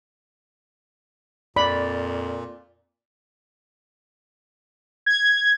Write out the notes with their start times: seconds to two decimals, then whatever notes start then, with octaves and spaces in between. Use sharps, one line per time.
1.56 F2 A#2 D5 B5
5.06 G#6